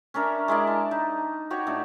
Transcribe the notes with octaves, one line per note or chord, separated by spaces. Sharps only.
C#4 D4 A#4 E5
G#3 E4 A#4 D5
A5
D#4
F#4 G4 C#5
A2 D4 A4